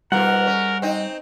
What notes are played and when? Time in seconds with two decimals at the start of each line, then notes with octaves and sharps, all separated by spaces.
0.12 G#2 B2 G3 F4 A#4 F#5
0.47 C#4
0.82 C4 D#4